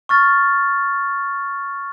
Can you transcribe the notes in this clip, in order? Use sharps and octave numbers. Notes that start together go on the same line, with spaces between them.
C#6 F6 A6